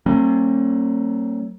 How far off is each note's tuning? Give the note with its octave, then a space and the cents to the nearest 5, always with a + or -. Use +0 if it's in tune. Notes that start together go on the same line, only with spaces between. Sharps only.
F#3 +40 A#3 -35 C#4 -45